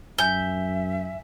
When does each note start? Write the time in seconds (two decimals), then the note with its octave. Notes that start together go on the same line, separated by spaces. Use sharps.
0.18 F#2 E5 G#5 G6 G7